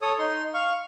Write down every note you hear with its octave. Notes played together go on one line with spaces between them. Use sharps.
A4 C#5 D#6
D#4 C6
F5 C#6